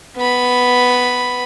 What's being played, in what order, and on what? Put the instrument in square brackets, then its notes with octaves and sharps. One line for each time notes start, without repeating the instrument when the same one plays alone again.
[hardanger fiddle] B3 B5